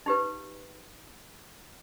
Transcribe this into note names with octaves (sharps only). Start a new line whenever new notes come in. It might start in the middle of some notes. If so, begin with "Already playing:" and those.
D#4 G4 B4